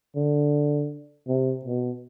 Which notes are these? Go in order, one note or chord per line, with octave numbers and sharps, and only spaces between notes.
D3
C3
B2